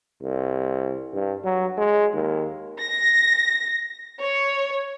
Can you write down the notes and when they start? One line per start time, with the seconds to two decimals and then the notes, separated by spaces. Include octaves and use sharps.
0.22 C2
1.13 G2
1.44 F#3
1.77 G#3
2.13 D#2
2.80 A#6
4.20 C#5